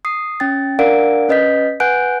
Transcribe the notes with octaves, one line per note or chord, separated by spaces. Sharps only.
D#6 C7
C#4 G5 A6
D4 A#4 D5 F5 F#5 D7
C#4 B4 D#5 G6 B6
B4 F#5 G#5 F#6 G6 D7